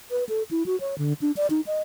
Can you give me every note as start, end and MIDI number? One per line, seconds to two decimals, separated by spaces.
0.11 0.24 71
0.29 0.43 69
0.51 0.63 64
0.66 0.79 66
0.80 0.95 73
0.98 1.13 50
1.22 1.31 62
1.37 1.47 74
1.50 1.61 63
1.67 1.82 75